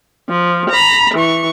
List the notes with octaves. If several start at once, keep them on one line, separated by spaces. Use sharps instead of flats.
F3
A#5 B5
E3 C#6